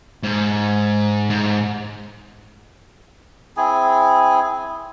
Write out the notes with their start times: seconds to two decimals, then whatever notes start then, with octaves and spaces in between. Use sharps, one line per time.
0.23 G#2
1.30 G#2
3.57 C4 E4 G#4 G#5